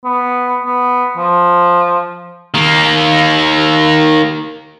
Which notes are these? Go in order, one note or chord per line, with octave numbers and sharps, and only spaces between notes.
B3
B3
F3
D#3 A#3